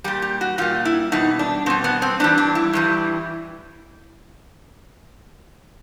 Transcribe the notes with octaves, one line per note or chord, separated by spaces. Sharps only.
A#2 G3 G4
G4
F#4
A#2 G3 F4
E4
B2 G3 D#4
D4
B2 G3 C4
B3
C4
G2 E3 G3 D4
D4
E4
G2 E3 G3